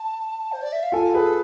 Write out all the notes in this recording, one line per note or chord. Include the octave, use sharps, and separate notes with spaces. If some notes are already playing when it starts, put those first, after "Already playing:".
Already playing: A5
C5
D5
E5
F5
F4 A4 G#5
G#4 A4 B4 C5